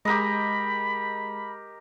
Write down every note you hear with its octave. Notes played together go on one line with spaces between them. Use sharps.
G#3 G4 A#4 D#5 B5